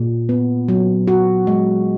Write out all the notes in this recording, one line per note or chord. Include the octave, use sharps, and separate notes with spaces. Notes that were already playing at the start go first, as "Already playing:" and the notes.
Already playing: A#2
B3
F#3
F#4
G#3